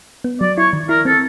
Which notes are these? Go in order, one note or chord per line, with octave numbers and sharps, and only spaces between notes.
B3
F#3 D5
E4 C#5
D#3
E4 A#4
C4 A4